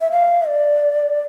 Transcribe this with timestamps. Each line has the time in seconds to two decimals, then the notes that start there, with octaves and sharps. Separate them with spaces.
0.01 E5
0.11 F5
0.48 D5